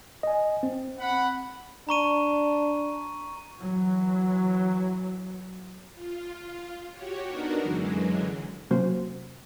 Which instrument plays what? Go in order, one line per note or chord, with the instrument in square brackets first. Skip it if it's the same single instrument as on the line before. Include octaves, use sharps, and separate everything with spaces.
[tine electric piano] D#5 G#5
C4
[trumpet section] F#5 B5
[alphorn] D4 [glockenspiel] A#5 C#6 D#7
[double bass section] E3 F#3
[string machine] F4
F#4 G4 C#5
B3 D4 D#4 F#4 A#4
F#2 D3 E3 F#3 G#3
[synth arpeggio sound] C3 F#3 A#3 C#4 F#4 C5